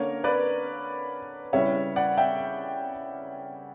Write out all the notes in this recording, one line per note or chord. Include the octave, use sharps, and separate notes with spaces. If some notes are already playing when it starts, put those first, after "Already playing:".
Already playing: D3 A#3 C#4 A#4 C#5
B4 D5
C#3 G3 C#4 E4 C#5 E5
D5 F#5
E5 G5